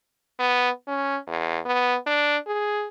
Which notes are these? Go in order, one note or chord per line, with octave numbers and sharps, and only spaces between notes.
B3
C#4
E2
B3
D4
G#4